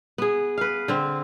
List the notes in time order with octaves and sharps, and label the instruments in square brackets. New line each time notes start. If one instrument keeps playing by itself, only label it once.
[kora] B3 G#4
B4 F5
D3 C4